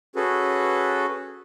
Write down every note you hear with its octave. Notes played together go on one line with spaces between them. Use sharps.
C#4 F#4 G#4 A4 B4